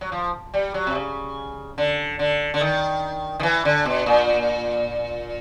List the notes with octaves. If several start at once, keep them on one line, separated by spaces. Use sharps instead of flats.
F#3
F3
G3
F#3
C3
C#3
D3
D3
D3
D#3
D#3
E3
D3
B2
A#2